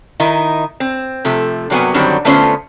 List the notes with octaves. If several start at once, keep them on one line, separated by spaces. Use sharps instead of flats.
D#3 D#4 E4
C4
C3 F3 A3
G2 C3 F#3 A#3 B3 G#5
F#2 D3 D#3 F#3 G3 C4
D3 A3 B3 C#4 F4 C5